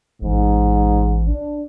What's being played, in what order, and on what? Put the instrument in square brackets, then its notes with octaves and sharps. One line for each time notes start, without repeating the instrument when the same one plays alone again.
[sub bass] A1 [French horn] G#2
[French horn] D4